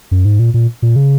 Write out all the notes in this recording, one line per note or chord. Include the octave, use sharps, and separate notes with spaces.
F#2
G#2
A#2
A#2
A#2
C#3